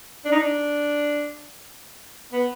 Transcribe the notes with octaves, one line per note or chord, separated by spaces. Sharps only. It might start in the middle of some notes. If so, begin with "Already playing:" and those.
D4
D#4
D4
B3